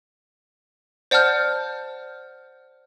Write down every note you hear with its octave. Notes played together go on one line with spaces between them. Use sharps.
C5 D5 F#5 A5 F6 G6